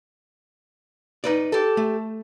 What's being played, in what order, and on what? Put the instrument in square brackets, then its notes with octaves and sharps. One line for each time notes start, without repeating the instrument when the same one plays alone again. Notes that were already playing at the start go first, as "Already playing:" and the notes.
[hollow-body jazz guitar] D#4 B4 D5
[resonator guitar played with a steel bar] G4 A4
[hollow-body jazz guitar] A3